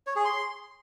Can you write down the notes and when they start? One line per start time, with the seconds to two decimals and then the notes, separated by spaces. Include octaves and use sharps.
0.07 C#5
0.16 G#4
0.25 C6